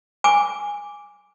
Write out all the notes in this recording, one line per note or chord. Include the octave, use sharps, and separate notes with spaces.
G#5 D6